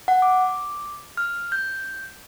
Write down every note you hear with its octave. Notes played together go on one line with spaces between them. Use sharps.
F#5
D6
F6
G6